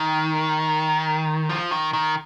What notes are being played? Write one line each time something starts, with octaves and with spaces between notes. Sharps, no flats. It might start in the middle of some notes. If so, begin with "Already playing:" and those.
Already playing: D#3
F3
D#3
D#3